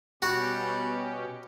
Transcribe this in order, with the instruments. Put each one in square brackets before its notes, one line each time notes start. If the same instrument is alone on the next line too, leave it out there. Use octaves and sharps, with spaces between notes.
[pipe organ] B2 C#4 G4 [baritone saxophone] G3 [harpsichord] F#4